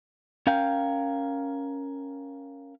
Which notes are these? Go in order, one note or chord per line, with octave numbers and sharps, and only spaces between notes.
C#4 A#4 F5 G5